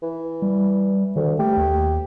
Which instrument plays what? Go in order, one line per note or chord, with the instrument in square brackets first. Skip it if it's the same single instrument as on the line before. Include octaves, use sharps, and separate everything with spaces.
[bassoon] E3
[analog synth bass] G3
[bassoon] D2 [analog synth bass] D#3
[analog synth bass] A3 [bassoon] G4
[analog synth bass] D#2